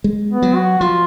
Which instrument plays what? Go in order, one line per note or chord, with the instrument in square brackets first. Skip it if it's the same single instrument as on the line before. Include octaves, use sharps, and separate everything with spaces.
[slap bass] G#3
[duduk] B3
[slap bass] F#3
[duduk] F#4
[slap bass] F3 [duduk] F4